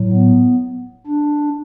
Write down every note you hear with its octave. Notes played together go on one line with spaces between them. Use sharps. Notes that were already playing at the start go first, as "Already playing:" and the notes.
Already playing: A2 F#3
B3
D4